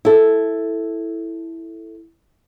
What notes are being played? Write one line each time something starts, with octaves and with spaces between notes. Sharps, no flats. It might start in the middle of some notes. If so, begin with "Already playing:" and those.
E4 A4